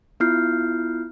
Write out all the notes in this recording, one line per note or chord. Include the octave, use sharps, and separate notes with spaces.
B3 E4 F4 F6 G6 C7